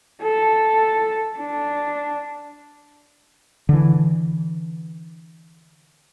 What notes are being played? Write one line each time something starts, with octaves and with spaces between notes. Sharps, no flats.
A4
D4
D3 E3